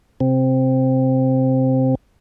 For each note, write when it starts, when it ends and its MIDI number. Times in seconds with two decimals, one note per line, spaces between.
0.20 1.95 48
0.20 1.95 60